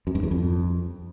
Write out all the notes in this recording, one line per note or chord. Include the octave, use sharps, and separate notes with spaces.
F#2
G2
E2
F2